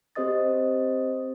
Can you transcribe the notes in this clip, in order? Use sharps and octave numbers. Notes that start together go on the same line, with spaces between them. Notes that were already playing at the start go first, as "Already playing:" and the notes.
C4 G4 C5 D#5 D#6 A6